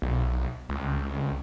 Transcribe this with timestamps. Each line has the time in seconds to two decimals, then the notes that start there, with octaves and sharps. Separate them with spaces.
0.02 B1
0.69 C#2